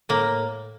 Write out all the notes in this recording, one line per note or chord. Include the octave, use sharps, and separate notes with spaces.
A2 A#3